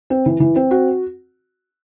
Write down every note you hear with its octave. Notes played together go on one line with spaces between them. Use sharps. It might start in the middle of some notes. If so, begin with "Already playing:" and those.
C4
E3
E3
C4
F#4